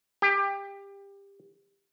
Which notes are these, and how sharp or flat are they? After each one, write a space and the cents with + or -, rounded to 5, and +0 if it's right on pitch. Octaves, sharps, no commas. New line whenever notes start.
G4 +20